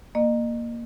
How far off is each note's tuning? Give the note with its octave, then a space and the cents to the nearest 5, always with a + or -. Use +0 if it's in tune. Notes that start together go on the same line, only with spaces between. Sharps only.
A#3 +0 D#5 -35